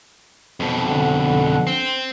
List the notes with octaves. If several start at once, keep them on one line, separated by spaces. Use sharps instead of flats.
F2 B2
D3 F#5
C4